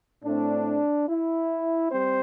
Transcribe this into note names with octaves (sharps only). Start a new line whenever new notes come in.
A2 A3 C4 D4
E4
G3 C4 C5